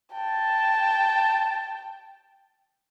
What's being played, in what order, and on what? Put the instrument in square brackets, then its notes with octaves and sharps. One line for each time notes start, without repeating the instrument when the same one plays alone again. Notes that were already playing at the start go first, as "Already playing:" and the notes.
[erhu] G5 [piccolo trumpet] A5